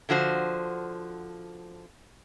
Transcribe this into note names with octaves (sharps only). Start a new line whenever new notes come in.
D3 F3 F#4 C5